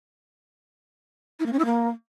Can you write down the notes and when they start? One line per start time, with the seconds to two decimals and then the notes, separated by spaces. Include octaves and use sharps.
1.39 E4
1.46 A#3
1.52 C#4
1.59 E4
1.65 A#3